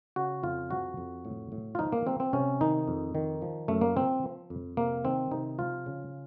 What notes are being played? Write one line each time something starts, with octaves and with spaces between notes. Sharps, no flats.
C#3 F#4
F2 F4
F3 F#4
F2
A2
A2
F4
F3 D#4
A#3
F3 C4
C4
C3 C#4
D#3 D#4
F2
D#3
F3
F#2 A3
A#3
F3 C4
F3
F2
C3 A#3
D#3 C4
C3 D#4
F3 F4
C#3